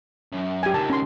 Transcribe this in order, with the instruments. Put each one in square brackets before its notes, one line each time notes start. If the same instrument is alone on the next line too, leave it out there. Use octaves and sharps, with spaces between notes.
[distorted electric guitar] F#2
[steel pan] G4 G#5
[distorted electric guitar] C#2 D#3 [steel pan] A5
[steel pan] C#4 C6